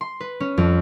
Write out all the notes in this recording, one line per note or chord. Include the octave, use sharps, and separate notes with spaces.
C6
B4
C#4
F2